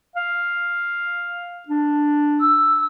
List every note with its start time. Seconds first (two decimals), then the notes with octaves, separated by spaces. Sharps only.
0.16 F5
1.69 D4
2.40 E6